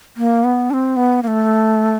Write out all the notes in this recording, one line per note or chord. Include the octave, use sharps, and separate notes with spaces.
A#3
B3
D4
C4
B3
A#3
A3